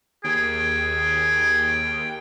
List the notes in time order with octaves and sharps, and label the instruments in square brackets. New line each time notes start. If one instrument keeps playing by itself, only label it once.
[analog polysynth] D#2 [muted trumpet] G#4 [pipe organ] G5